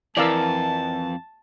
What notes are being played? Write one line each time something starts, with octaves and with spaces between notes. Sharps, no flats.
F2 E3 A#4 D5 F5 A5 E6